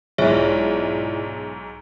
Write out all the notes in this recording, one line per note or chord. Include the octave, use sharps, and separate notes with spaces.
B1 G#2 E4 F4 G#4 C#5 D5 E5